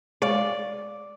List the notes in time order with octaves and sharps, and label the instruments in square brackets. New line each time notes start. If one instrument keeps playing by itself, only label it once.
[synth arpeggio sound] G#3 C#5 F5 [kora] D5